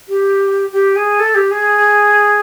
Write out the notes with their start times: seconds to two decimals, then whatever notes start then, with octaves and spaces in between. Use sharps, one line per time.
0.08 G4
0.72 G4
0.96 G#4
1.19 A4
1.35 G4
1.51 G#4